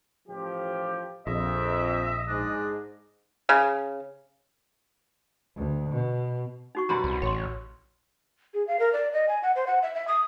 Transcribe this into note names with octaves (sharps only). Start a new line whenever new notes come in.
A1 F3 G4
A#1 F2 D#5 E5
G#2 D4
C#3
D2
B2
D#4 F#4 C#6
F#2 B2 G3 A#5 C6
C2
A1 C#5 B5 C6
G#4
F5
A#4
D5
D#5
G#5
F#5
C5
F#5
E5
E5
D#6